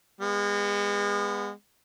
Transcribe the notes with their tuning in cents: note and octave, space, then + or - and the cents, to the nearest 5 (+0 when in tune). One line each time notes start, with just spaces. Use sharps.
G#3 -35 B3 -5